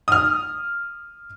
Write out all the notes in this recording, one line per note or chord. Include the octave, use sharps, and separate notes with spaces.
D#6 F6